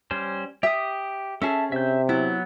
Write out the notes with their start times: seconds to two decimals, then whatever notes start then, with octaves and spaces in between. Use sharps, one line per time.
0.11 G3 C#4 C5
0.63 G4 E5 D#6
1.42 C#4 G#4 A4 E5 A5
1.72 C3 E5 G6
2.09 F#3 B3 E4